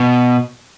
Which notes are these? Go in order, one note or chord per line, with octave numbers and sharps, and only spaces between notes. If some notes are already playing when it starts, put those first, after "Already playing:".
Already playing: B2